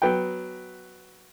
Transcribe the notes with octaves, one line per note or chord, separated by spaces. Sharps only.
F#3 B3 B4 G5